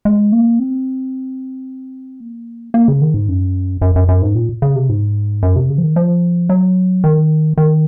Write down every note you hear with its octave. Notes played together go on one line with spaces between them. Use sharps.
G#3
A#3
C4
A#3
A#3
C#3
D#3
G#2
F#2
F#2
F#2
F#2
G#2
A#2
C#3
C3
G#2
F#2
C3
C#3
F3
D#3
F3
F#3
D#3
D#3